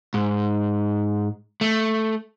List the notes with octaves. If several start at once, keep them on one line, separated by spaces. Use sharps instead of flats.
G#2
A3